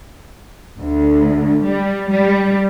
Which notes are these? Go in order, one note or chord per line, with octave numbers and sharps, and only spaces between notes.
D2
G3
G3